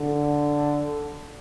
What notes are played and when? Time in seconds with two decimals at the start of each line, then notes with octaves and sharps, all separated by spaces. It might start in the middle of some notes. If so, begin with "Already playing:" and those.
Already playing: D3